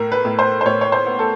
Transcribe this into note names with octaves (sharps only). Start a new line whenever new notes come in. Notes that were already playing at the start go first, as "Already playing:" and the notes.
Already playing: A2 A#4
B4
A2
C5
C5
A2 C#5
C#5
C5
B3
A4